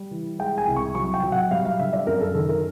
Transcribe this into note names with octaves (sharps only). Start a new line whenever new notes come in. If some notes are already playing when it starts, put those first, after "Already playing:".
Already playing: G3
E3
G#3 G5
G#5
C2
C#6
F#3 C#6
G5
F#3
F#5
G3 F5
F5
D3 E5
D5
F#2 A#4
A4
D#3 A4
A#4